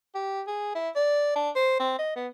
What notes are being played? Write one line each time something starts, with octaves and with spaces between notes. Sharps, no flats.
G4
G#4
E4
D5
D4
C5
C4
D#5
B3